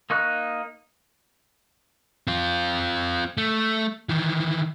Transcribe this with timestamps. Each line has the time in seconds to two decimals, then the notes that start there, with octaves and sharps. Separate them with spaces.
0.10 A#3 D#4 C#6 F#6
2.27 C4 F4
3.37 A3
4.09 D#3 E3